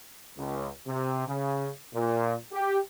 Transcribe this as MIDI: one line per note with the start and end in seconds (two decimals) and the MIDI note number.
0.37 0.69 37
0.87 1.24 48
1.27 1.70 49
1.94 2.35 46
2.53 2.78 67